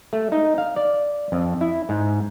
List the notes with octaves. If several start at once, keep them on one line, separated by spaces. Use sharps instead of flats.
A3
D#4
F5
D5
F2
E4
G#2